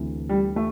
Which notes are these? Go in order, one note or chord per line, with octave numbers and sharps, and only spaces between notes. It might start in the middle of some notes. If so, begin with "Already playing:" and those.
Already playing: D2 C3 E3
G3
A3